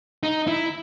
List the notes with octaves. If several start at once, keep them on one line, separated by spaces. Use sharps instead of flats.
D#4
E4